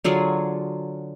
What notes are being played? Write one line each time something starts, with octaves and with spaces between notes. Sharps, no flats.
D3 F#3 F4 G#4